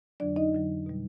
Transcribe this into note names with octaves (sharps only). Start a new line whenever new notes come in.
F2 D3 F#3 D4 D5
D#4 D#5
F2 D3 F#3
B2 G3